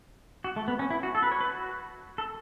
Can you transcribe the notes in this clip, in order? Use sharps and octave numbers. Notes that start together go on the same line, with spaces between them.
F#4
A3
B3
C#4
E4
F#4
A4
B4
C#5
B4
F#4
A4